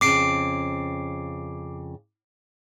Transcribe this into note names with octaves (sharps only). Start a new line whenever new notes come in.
F2 C#3 C4 D6 C7 D7